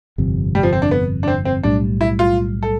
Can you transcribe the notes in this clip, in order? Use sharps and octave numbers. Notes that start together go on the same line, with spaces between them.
G1 F2 C3
G3
F3
C4
D4
B3
D4
C4
C4
B1 A2 G3 D4
E4
F4
A4